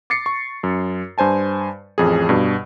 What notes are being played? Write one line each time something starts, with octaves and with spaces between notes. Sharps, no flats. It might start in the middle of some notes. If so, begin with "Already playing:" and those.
D6 A6 C7 C#7
C#6
F#2
G2 C5 G#5 A5
A1 F2 G#4
G2 B2